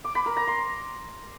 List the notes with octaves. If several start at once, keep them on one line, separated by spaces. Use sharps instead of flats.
D6
B5
A#4
A#5
C6